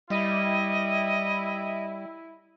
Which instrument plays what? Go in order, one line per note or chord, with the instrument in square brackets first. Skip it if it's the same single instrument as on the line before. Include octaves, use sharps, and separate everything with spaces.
[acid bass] G3 [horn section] E4 [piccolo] D#5